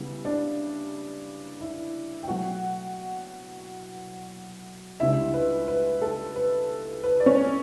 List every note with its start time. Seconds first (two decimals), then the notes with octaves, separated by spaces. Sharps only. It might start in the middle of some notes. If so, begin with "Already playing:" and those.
Already playing: C#3 G3 B3 E4
0.25 D4 D5
1.61 E4 E5
2.23 G5
2.28 B2 F#3 A3 F#4 F#5
5.00 C#2 C#3 G3 D4 E4 E5
5.34 B4
5.68 B4
6.02 A4
6.36 B4
7.03 B4
7.20 D5
7.26 C#4 C#5